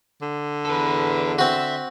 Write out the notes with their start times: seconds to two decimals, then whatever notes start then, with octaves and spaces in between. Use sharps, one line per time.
0.22 D3
0.65 E2 A4 B4
1.39 C4 F#4 E5